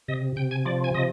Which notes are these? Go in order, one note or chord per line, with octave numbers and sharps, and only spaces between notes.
C3 D#5
C3 G5
G#5
F3 D5
G#5
C3 D#5